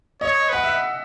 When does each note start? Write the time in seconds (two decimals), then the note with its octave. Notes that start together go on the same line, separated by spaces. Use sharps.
0.21 C#5 D#5
0.49 B4 F#5
0.64 E5